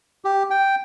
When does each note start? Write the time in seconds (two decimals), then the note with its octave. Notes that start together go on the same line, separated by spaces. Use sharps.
0.25 G4
0.50 G5